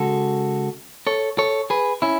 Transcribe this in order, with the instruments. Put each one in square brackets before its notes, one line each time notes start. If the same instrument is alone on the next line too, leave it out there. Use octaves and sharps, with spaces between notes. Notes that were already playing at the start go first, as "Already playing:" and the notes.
Already playing: [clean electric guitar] C#3 G#3 F#4 A4
A4 C#5
A4 C#5
G#4 B4
C#4 E4